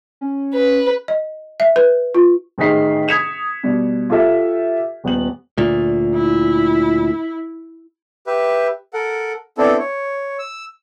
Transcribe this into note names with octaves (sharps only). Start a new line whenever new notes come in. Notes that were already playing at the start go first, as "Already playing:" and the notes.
C#4
B4
D#5
E5
B4
F4
A1 D#3 G#4 D#5 B6 C7
D#6 G#6 B6 C#7 E7 F7
B2 G3
F4 G4 A4 E5
D#1 B3 F#7
D2 A#2
E4
G4 B4 E5
A4 A#4 F#5
B3 C4 D4 E4 A4
C#5
E6